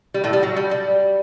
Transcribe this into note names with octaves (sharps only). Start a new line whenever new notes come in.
G3
A2 A3
G3
F#3
G3
G3